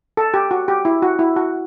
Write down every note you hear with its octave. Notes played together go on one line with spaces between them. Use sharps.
A4
G4
F#4
G4
E4
F#4
E4
F#4